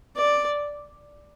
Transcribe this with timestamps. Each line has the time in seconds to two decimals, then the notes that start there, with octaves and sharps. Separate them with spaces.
0.16 D5